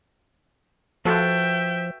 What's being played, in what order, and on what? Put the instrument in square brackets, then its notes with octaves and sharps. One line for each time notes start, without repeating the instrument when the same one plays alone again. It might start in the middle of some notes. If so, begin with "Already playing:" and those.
[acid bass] F3 [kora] F#4 A4 B4 [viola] E5 G5